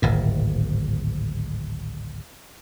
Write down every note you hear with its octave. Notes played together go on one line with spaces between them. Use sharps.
D1 G#1 A#2